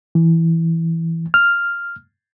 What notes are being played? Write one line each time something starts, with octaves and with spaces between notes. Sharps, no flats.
E3
F6